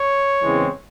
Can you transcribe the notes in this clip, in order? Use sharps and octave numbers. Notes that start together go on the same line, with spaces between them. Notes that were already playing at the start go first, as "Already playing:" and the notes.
Already playing: C#5
E2 C#3 E3 G#3 C4